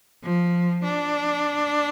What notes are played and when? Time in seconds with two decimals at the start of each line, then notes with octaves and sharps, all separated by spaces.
0.24 F3
0.84 D4